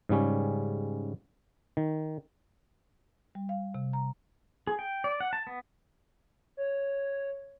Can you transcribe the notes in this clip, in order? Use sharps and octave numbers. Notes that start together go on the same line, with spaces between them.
G#2 C#3 G3 C#4
D#3
G3
F5
C3
A#5
G#4
G5
D5
F#5
A5
B3
C#5